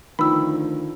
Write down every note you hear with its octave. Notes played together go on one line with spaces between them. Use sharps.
D2 D#3 F3 B5 E6